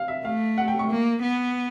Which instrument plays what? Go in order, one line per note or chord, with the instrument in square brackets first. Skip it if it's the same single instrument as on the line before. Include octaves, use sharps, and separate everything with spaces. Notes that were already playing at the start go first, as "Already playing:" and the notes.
Already playing: [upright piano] F5
E5
[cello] A3 [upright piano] F5
[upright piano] F#5
G5
C#6
[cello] A#3
B3